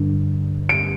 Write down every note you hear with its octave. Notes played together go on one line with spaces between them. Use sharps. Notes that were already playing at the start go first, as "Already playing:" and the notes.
Already playing: G2 D3
D7